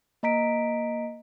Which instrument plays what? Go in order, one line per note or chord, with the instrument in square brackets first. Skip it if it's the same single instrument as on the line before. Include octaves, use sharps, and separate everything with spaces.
[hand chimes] A#3 D#5 A#5 B6 D7